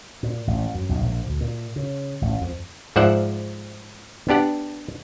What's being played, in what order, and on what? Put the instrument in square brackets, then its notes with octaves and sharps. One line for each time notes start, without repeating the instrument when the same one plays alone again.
[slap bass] A#2
A1
F#2
B1
A#1
D2
A#2
C#3
A1
F2
[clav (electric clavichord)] G#2 F3 C5 D5 E5 F#5
B3 D4 G4 F#5